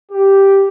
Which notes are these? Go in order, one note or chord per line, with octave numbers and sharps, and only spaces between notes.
G4